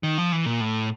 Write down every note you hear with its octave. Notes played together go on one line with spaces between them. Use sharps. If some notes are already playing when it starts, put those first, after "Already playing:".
D#3
F3
E3
A#2
A2